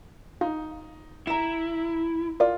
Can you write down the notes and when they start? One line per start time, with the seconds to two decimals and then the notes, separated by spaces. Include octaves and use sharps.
0.41 D#4 F4
1.27 E4 A#5 E7
2.40 F4 A#4 D5